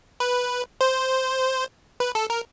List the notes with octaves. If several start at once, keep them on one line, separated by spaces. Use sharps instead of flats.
B4
C5
B4
A4
A#4